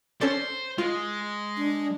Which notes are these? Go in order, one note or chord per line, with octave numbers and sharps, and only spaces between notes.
C#4 A4 C5 D5
G#3 F4
D4